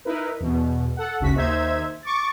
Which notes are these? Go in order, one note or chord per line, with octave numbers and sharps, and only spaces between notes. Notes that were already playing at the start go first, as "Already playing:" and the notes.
D#4 E4 A#4 B4
E2 B2
A4 F#5
G#1 D2 C#3 F#4 B6
D#2 D#4 C5 E5 G#6
C#6 D6 A6